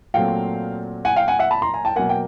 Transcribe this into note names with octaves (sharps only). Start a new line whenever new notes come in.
A#2 F#3 A3 C4 F5 G5
F#5 G#5
F5 G5
F#5 G#5
E5 F#5
A5 B5
A#5 C6
G#5 A#5
G5 A5
B2 F#3 A#3 F#5 G#5
G5